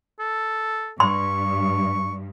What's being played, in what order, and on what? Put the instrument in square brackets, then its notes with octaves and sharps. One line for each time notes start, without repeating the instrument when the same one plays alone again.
[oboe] A4
[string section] G2 [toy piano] C6 [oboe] C#6